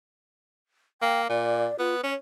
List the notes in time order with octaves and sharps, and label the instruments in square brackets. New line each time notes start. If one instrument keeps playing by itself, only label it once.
[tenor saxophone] A#3 [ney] G5
[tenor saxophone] A#2 [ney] D5
[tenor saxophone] B3 [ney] F4
[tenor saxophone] C#4 [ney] C#5